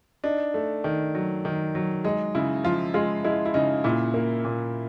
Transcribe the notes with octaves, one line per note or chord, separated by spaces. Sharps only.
D4 D#4
A3
D#3
F#3
D#3
F#3
G#3 D#4
C#3 E4
F3 F4
G#3 F4
G#3 E4
E4
C#3 D#4
A#2 E4
A#3
A#2